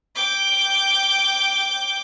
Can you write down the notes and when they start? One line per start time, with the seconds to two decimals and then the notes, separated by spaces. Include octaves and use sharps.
0.16 G5 D6